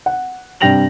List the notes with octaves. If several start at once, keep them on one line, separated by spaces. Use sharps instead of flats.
F#5
G2 C3 G5 A#6 F7 F#7